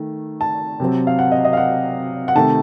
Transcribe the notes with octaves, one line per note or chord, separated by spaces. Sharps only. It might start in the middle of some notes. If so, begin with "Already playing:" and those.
Already playing: D#3 A3
A5
C3 F#3 C4
F5
F#5
D#5
D#5
F5
F#5
F#5
C3 D#3 A3 A5